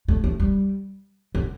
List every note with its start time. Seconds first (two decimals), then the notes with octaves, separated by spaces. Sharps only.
0.08 A3
0.24 A3
0.40 G3
1.35 D3